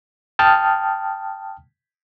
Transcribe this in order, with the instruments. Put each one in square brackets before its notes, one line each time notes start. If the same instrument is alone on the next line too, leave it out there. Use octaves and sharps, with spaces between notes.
[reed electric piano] G5 A5 D#6 F6